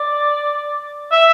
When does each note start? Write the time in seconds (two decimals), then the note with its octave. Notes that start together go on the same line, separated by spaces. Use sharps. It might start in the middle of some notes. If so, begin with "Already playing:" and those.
Already playing: D5
1.11 E5